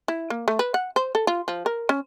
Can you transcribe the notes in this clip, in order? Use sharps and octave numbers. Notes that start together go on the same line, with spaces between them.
E4
A#3
A3
B4
F#5
C5
A4
F4
F3
A#4
C#4